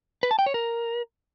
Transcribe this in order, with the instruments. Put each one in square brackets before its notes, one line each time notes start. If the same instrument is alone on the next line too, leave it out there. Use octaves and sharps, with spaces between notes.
[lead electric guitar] B4
A5
G5
C#5
A#4